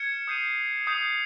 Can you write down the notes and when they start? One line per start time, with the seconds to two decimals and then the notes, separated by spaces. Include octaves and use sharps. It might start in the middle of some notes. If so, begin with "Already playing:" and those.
Already playing: F6 G#6 C#7 E7
0.28 D#6 G6 C7 D#7
0.87 D#6 G6 C7 D#7